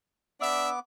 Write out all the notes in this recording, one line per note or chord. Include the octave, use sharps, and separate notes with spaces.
B3 D4 E5 D6